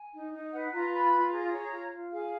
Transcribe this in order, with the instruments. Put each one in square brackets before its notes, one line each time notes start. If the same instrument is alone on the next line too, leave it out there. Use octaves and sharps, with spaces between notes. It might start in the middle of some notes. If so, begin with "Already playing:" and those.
Already playing: [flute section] G#5
D#4
D#4
B4 F#5
F4 A#5
B4 B5
F4
G#4 A#5
C#5
F4
F4
G#4 F5